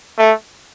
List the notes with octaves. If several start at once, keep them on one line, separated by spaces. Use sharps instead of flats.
A3